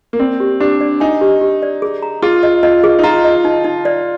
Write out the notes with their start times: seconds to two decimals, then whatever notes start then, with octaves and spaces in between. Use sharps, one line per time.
0.13 A#3
0.19 C4 D5
0.40 G4
0.60 D4 G4
0.81 D5
1.00 D#4 G#5
1.21 G4
1.41 G4
1.62 D5
1.82 G#4
2.02 A#5
2.22 F4 G#4
2.43 D#5
2.63 F4 D#5
2.84 G#4
2.99 D#4
3.03 F4 A#5
3.24 D#5
3.45 D#4
3.64 D#4
3.85 D5